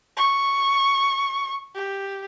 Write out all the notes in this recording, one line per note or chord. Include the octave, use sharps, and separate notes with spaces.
C#6
G4